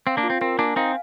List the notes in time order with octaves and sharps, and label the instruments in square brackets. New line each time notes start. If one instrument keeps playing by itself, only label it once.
[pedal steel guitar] C4 [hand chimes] F5
[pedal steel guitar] A#3 D4
[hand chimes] F4
[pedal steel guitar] C4
[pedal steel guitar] C4 [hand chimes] A#4
[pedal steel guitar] A#3 D4 [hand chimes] G#5
[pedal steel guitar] C4 D#4 [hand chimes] F5